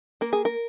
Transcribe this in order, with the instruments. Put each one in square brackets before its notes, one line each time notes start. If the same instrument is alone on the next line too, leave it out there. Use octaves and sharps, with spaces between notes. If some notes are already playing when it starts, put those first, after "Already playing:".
[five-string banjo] A#3 A#4
G#4
A#4